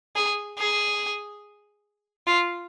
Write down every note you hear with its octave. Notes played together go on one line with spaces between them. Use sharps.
G#4
G#4
F4